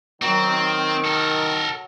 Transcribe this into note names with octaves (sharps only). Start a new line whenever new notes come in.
D#3 F#3 C4
A4 A#4